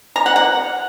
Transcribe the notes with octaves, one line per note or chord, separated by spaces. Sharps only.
A#5
F#5
F#5